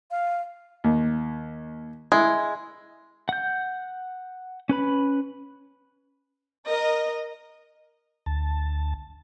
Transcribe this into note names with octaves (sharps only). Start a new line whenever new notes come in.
F5
D#2
G#3 E4
F#5 G6
C#4 B4 B5
A#4 D#5
D2 A5